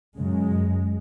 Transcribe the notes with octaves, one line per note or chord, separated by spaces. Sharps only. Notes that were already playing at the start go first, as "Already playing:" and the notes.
F#2 C#3 G#3